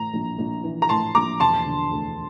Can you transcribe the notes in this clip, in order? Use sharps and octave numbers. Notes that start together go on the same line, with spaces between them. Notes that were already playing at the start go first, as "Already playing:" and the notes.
Already playing: A2 E3 A#5
A#1
A#1
E3
A#5
A2 A5 C6
A#1 A#5 D6
E1 A5 C6
D3
D2